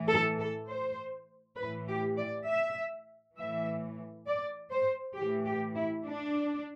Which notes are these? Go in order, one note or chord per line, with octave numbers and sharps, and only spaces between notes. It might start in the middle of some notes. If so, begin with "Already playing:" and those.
Already playing: A2 E3
A4
A4
C5
A2 E3 B4
G4
D5
E5
A2 E3 E5
D5
C5
A2 E3 G4
G4
E4
D4